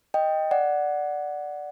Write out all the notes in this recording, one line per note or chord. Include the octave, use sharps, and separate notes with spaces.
D#5 G5
D5 F#5